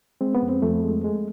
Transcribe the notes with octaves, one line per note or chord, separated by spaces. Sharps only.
G#3 C4
B3
F2
C4
F2 A3
G#3
G#3